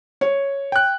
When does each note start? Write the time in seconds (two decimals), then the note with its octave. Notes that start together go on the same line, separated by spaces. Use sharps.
0.21 C#5
0.72 G5 F#6